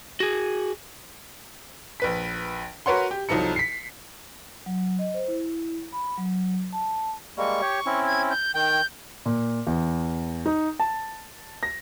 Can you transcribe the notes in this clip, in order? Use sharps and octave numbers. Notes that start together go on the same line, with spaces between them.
F#4 G#4
A#1 B4 B6
F#4 A#4 B4 C#5 F#5 C6
G4
C2 F3 F#3 D#4 A4 C#7
B6 C7
F#3
D#5
C5
E4
B5
F#3
A5
G3 G#3 A#3 C#6
G4 C#5
C4 C#4 E4
G#6
G6
D#3 G5 G6
A#2
E2
D#4
A5
A#6